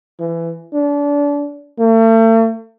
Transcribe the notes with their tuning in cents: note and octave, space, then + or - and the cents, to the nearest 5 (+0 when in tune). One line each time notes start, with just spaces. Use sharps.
E3 +20
D4 -30
A3 +40